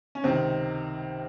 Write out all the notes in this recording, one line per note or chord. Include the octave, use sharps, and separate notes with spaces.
C#4
C#2 C3 D#3 C4